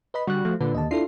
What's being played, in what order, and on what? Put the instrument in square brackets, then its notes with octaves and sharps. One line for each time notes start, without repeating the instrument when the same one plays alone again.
[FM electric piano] B4 D#5 B5
[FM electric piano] D3 [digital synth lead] G3 [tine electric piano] F#4 F#6
[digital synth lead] F3 [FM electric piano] A3
[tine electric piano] A#2 [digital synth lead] D3 [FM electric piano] B4
[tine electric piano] D#2 [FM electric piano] D#5 A5
[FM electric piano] D4 E4 A4 [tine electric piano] F4 [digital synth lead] C7